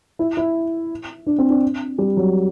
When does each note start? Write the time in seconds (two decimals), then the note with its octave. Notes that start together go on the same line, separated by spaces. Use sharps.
0.19 E4
0.37 E4
1.27 D4
1.38 C4
1.50 D4
1.98 G3
2.17 F#3